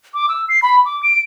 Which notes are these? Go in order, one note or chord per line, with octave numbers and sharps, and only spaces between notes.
D6
E6
C7
B5
D6
D7